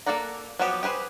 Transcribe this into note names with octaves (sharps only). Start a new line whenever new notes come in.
A#3 A4 D5 F#5 A#5
F3 F#3 B3 F#4 G4
G4 G#4 B4 C5